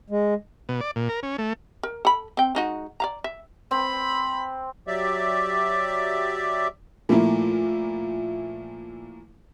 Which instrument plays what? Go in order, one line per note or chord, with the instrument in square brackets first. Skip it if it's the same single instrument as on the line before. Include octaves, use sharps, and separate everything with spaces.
[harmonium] G#3
[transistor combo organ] B2
D5
A#2
A#4
C#4
A3
[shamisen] A#4
A4 B5
C4 G5
G#3 D#4 F#4
D5 F5 A#5
E5
[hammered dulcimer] C4 [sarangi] B5
[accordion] F#3 G4 D5 E5
[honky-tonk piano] A#2 F3 A3 A#3 E4